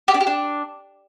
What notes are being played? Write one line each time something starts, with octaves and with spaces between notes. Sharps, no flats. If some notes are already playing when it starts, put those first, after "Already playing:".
G4
D4
G4
D4